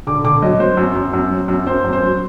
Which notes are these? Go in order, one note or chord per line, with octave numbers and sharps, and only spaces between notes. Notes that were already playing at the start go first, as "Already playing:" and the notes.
D3 D6
D3 D6
F#3 D#5
F#3 C5
F#2
F#2
F#2
F#3
F#2
F#2 C5
F#2
C5
F#3